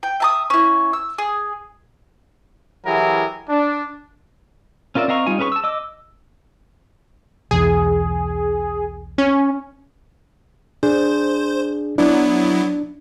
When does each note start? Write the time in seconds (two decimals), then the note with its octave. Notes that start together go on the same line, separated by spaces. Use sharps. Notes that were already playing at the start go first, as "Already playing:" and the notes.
0.03 G5
0.20 E5 A5 D#6
0.50 C#4 E4
0.93 E6
1.18 G#4
2.85 E3 F#3 E4 G4 G#4 A#4
3.49 D4
4.95 C#4 F4 A#4 D5 E5
5.08 C4 D#5 F5 A#5 C#6
5.26 G3 D#4 F4 G#5
5.39 C#4 G#4 B4 A#5 C#6
5.52 A5 E6
5.64 D#5 D6 E6
7.51 B1 E2 G#4
9.18 C#4
10.83 D4 G#4 C5
11.98 F#3 B3 D4 E4